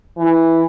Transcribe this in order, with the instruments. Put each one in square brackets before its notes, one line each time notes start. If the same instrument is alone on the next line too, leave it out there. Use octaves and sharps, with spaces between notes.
[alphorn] E3